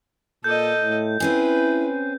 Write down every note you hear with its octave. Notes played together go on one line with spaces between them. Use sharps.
A#2 A4 D#5 G6
A2
C4 C#4 E4 G#4 B4